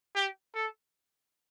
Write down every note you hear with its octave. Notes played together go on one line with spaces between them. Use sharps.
G4
A4